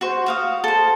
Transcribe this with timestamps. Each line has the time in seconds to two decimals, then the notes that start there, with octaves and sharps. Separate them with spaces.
0.01 F#4 C5
0.26 F#4 F5 D#6
0.64 A4 C5